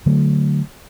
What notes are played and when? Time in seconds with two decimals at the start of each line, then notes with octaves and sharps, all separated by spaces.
0.06 D3 F#3 A3